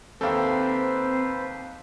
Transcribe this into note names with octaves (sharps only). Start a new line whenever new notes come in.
D#2 A#3 C4 A4 B4 C5 E5 G5